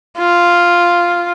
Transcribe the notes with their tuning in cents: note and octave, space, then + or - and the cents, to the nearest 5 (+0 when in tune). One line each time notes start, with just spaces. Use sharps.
F4 +0